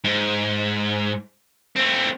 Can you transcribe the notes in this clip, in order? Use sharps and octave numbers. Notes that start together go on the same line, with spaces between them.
G#2
A3 C4